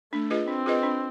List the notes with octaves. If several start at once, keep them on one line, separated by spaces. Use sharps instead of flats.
A3 D4
F4 G#4 B4 D#5
C4 D4
F4 G#4 B4 D#5
D4